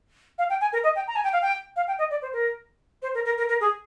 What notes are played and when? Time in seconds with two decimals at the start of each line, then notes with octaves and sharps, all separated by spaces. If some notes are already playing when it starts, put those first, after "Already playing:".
0.38 F5
0.50 G5
0.61 G#5
0.73 A#4
0.84 D#5
0.96 G5
1.07 A#5
1.16 G#5
1.24 G5
1.33 F5
1.42 G5
1.76 F5
1.88 G5
1.99 D#5
2.11 D5
2.22 C5
2.33 A#4
3.02 C5
3.14 A#4
3.25 A#4
3.38 A#4
3.49 A#4
3.60 G#4